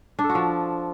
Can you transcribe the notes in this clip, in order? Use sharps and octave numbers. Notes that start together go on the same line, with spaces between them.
D4
A4
F#4
F3